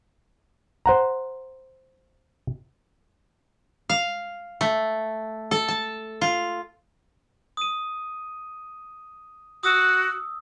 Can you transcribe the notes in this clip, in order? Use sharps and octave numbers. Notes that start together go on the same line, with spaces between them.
C5 F#5 A#5
F5
A3
A4
A5
F4
D#6 D#7
F#4 D#6 E6